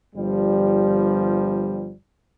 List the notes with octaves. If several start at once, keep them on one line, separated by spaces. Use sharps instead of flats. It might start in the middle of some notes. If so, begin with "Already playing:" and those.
G1 F3 G3